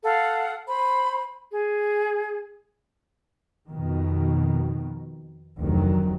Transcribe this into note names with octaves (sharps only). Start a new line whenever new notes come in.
A4 F5 F#5
C5 B5
G#4
F2 B2 D#3
F1 D2 D#3 F#3